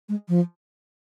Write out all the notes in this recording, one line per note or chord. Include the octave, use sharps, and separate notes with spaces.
G#3
F3